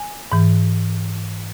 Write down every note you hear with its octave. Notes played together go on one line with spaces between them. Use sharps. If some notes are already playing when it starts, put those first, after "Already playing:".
Already playing: G#5
G#2 E3